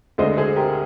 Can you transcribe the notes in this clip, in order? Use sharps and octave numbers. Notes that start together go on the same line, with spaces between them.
D2 D3 G#3 D4 C5 D#5
G#4 C5
G4 A#4